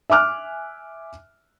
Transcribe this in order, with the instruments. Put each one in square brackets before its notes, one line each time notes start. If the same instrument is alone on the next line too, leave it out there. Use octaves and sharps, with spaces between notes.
[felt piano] E5 G#5 D6 F6 F#6